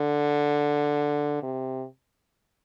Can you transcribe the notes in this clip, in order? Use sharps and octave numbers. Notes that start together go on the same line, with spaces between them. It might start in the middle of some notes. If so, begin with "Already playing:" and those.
Already playing: D3
C3